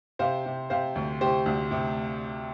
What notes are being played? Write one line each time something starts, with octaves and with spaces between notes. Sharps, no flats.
C3 C5 F5
C3
C3 C5 F5
D2
C3 G4 C5
D2
C3